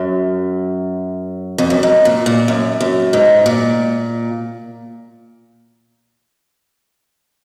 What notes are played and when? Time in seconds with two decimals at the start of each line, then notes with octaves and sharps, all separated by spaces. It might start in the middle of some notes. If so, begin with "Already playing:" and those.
Already playing: F#2
1.58 F2
1.70 F#2
1.83 G#2
2.05 A#2
2.26 A#2
2.48 F#2
2.81 F#2
3.13 G#2
3.46 A#2